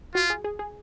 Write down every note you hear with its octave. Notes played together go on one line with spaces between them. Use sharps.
F4 F#4
G#4
G#4
G#4